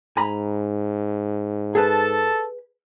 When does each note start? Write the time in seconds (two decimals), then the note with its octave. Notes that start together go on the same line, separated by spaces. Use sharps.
0.17 G#2 G#5 A#5 B5
1.75 G#4 A4 B4 A5